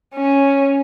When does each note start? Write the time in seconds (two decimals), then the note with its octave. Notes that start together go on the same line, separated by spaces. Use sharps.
0.15 C#4